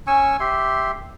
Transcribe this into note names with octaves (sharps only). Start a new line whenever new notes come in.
C#4 G#5 C#6 E6
G4 E5 C6